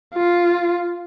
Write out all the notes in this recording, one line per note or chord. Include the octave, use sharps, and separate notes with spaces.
F4